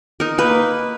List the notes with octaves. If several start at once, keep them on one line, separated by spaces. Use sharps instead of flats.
D#4 A#4
A#3 B4